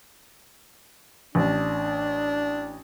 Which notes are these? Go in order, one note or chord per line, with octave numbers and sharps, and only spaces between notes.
A1 D4